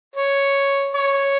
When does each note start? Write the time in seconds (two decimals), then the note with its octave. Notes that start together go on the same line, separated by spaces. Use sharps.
0.16 C#5
0.95 C#5